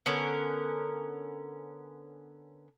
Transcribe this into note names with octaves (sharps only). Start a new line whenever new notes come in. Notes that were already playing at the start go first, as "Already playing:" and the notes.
D3 B3 C#4 A#4